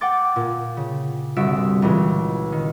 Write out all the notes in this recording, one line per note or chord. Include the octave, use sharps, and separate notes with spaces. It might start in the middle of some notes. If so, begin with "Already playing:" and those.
F#5 G5 D6 A6
A#2
C#3
G1 C2 F#4 E5 D7
C#2 A#2 E3
D#3